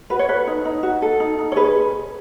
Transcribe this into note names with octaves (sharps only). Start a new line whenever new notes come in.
F#4 B4
C#5
A4 B4
D#4
D#4
F#4
A4
D#4
D#4
C#5
G#4 B4